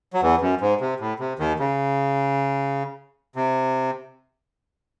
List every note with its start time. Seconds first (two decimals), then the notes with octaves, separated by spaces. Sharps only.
0.13 F#3
0.21 E2 E3
0.41 F#2
0.61 G#2
0.81 C3
1.00 A2
1.20 C3
1.39 D#2 D#3
1.60 C#3
3.36 C3